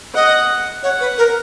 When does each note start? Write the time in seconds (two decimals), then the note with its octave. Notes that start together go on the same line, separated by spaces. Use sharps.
0.14 D#5 F#5
0.83 C#5 F#5
1.00 B4
1.18 A#4